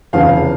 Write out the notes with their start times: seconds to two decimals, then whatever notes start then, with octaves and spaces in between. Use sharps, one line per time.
0.13 F1 E2 C#3 F3 F5